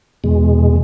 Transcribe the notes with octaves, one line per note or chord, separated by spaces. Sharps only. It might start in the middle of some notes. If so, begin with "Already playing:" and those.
E2 B2 G#3